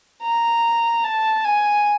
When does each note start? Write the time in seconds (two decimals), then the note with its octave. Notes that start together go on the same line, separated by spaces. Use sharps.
0.23 A#5
1.04 A5
1.45 G#5